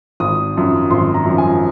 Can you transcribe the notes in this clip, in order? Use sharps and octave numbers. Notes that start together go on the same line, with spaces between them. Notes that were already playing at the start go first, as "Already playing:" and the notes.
G#1 D#6
F#2 F3
G#1 C6
A#5
F#2 F3
G#5